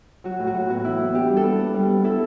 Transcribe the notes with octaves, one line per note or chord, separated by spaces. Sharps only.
F#3 F#4
A2
F#4
A2
B3 F#4
E3 E4
B3
D4 G4
G3
A4
B3
B3
G3
B3
E4 A4